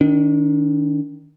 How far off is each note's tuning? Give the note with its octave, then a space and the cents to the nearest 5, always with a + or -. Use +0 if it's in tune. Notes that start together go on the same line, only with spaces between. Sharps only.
D#3 +0 D4 -40